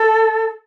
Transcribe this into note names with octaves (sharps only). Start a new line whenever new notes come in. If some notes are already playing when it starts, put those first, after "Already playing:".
Already playing: A4